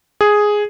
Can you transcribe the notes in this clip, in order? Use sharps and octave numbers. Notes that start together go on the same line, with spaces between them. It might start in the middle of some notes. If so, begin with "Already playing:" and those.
G#4